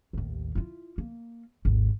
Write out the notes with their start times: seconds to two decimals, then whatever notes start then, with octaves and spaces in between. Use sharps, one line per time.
0.13 A1 D#2
0.55 E4 F4
0.98 A#3
1.65 G#1 D#2